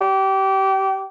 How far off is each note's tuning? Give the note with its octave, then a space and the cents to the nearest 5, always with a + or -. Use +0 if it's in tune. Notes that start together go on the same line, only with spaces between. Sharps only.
G4 -25